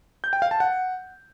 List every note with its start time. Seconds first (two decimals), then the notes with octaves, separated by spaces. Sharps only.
0.24 G6
0.33 G5
0.42 F5
0.51 A5
0.60 F#5